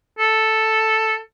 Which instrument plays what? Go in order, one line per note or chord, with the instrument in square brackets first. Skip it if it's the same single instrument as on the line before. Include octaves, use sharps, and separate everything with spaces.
[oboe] A4